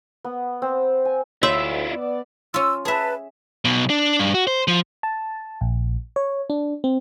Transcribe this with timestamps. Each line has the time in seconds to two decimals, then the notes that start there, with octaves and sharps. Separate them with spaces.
0.24 B3
0.62 C4
1.05 G#5
1.43 D2 E4 F4 C#5 E5 C6 E6
1.92 B3 D5
2.54 C#4 F4 E6
2.85 G#4 B4 E5 A5
3.65 B1 B2
3.90 D4
4.20 G2
4.34 F#4
4.47 C5
4.68 F3
5.03 A5
5.61 A#1
6.16 C#5
6.50 D4
6.84 C4